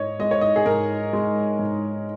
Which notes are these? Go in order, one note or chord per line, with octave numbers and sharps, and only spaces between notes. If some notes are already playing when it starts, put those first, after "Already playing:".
Already playing: G#2 C#5 D#5
G#3 D#5
C#5
D#5
G#4
G#2 A#4
G#3
G#2